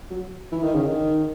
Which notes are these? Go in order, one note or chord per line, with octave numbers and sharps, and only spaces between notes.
F#3
E3
D#3
C#3
D#3